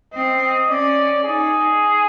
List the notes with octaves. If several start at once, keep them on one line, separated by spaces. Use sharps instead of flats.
C4 D#5
C#4 D5
D#4 G#4